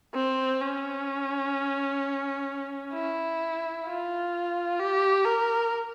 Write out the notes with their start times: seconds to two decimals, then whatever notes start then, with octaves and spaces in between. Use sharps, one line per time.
0.15 C4
0.61 C#4
2.94 E4
3.86 F4
4.79 G4
5.25 A#4